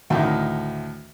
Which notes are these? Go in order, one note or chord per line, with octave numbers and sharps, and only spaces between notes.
D2 A2 D#3